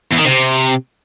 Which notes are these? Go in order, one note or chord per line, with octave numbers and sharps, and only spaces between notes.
E2
D#3
C3